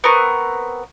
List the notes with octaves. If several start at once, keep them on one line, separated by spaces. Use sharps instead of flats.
B3 C4 A#4 C#6